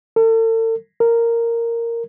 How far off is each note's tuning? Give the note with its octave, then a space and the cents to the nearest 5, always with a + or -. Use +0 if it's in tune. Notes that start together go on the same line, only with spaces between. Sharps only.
A4 +45
A#4 -10